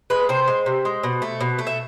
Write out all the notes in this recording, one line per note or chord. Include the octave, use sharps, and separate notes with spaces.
G#3 B4
C3 C5
G#3
C3
G#3
B2
A3
B2
A3
E5